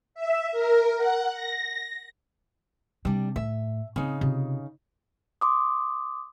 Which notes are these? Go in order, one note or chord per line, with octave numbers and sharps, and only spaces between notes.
E5
A#4
F#5
A#6
C3 G3 D4
A2 E5
C#3 C4 D#4
C3 F4
C6 D6 D#6